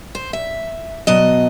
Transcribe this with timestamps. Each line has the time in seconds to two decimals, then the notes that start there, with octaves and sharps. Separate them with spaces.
0.15 C5
0.33 E5
1.07 B2 F#3 D#5